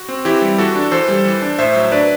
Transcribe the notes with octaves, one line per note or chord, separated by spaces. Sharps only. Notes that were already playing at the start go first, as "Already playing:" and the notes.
Already playing: F#4
C4
E3 E4 G4
G3
E3 F#4 A4
D4
E3 A4 C5
G3
E3
D4
A2 C5 E5
F#3
D4 B4 D5